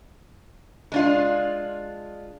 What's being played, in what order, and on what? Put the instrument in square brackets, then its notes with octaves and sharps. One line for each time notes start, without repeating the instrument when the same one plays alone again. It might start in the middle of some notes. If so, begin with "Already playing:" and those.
[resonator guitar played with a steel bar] G#3 D4 F4